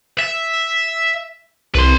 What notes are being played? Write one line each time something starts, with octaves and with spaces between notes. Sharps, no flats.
E5
C2 B4 C6